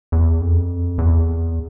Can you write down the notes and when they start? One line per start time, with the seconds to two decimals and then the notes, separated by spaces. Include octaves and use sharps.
0.12 E2
0.41 F2
0.98 E2